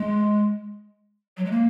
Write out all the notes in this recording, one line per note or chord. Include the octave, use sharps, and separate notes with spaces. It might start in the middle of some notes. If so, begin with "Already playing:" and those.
Already playing: G#3
F#3
G#3
A#3